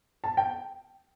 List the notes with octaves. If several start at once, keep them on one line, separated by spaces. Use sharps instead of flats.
A5
G5